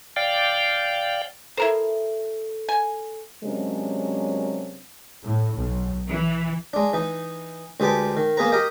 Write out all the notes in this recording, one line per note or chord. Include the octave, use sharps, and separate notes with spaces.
D5 F5 G5
E4 A4 A#4 C5
G#5
C3 F#3 G#3 A#3 C#4 D4
A2
B1
E3
G#3 D4
E3 D#4
D2 G#3 G4 B4 A5 D6
D#3
A#3 B3 G#4 B4 A#5
G4 A#4 D#5 G5